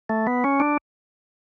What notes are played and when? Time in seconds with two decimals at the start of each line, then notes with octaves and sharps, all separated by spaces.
0.09 A3
0.27 B3
0.44 C#4
0.60 D4